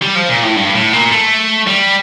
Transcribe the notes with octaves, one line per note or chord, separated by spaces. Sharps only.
G3
F3
A#2
A2
G2
A2
A#2
A3
G3